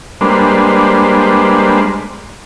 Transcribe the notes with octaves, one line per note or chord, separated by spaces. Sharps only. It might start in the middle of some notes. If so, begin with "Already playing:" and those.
G3 G#3 A#3 D4 B4 C5